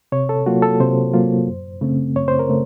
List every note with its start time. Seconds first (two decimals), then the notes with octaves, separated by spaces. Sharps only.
0.12 C3 C#5
0.29 A4
0.46 F#3 A#3 F4 F#4
0.62 A4
0.80 C3 C5
1.14 F#3 A#3 F4
1.47 F#2
1.81 C#3 A3 C4
2.15 F#2 C#5
2.28 C5
2.39 A#4
2.49 C#3 A3